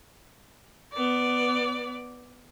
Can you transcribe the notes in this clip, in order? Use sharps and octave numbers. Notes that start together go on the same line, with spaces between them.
B3 D5